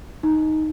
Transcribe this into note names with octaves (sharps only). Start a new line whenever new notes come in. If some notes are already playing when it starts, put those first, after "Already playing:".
D#4